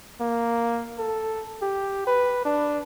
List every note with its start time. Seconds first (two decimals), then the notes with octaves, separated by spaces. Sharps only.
0.21 A#3
0.98 A4
1.62 G4
2.07 B4
2.45 D4